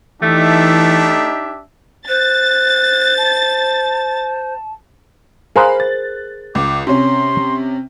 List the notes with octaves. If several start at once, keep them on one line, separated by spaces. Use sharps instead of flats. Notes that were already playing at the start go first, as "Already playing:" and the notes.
E3 A3 D4 D#4 G4 E5
C5 F#6 A6
A5
G#4 A#4 C5 F5 B5 F#6
A6
C#2 D6
C3 C#4 C6